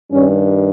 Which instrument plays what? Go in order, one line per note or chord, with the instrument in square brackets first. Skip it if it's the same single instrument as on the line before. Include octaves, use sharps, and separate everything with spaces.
[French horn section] G2 D#3 G3 C#4